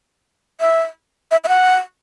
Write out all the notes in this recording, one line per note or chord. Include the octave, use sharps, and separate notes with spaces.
E5
E5
E5
F#5